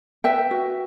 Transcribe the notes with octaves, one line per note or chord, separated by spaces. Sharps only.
B4 E5 G5
F#4